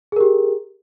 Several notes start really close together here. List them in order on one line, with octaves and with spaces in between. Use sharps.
G#4 A#4 G4